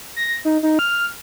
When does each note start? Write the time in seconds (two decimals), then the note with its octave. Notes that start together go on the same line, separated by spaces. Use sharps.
0.16 A#6
0.45 D#4
0.63 D#4
0.79 F6